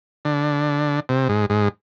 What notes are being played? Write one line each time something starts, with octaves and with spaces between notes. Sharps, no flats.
D3
C3
G#2
G#2